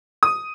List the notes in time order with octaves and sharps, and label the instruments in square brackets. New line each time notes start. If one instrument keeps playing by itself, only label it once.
[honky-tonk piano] D#6